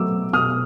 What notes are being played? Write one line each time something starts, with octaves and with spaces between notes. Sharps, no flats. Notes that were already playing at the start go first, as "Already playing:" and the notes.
Already playing: B2 F#3 A3 D6 E6
B2 D#6 F6